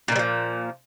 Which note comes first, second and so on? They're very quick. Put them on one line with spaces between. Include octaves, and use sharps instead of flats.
A#2 D#3 G3 F3